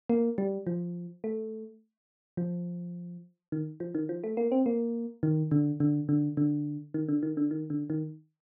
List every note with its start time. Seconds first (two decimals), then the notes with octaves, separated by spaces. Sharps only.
0.09 A#3
0.38 G3
0.67 F3
1.24 A3
2.37 F3
3.52 D#3
3.80 F3
3.95 D#3
4.09 F3
4.24 A3
4.37 A#3
4.52 C4
4.66 A#3
5.23 D#3
5.51 D3
5.80 D3
6.09 D3
6.37 D3
6.94 D#3
7.09 D3
7.23 D#3
7.37 D3
7.51 D#3
7.70 D3
7.90 D#3